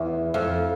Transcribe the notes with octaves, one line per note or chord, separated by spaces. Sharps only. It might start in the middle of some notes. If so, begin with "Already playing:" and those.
Already playing: E2
F2